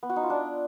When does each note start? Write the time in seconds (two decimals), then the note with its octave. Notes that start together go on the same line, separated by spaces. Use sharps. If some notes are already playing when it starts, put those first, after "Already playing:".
0.03 B3
0.09 F#4
0.16 D#4
0.23 F4
0.30 D4